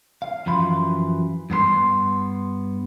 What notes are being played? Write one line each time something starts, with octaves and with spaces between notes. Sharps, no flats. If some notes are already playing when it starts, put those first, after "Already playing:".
F5
F#2 E3 F3 B5 C6
G2 B3 A4 C6